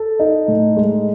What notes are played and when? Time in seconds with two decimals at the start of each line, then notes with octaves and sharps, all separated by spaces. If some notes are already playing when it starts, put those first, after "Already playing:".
Already playing: A4
0.19 D#4
0.48 A2
0.77 G#3